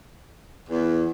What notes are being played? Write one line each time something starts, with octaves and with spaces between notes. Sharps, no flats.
E2